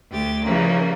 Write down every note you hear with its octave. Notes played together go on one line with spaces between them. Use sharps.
D2 G4 A6
C#3 E3 F3 G3 A#3 C#4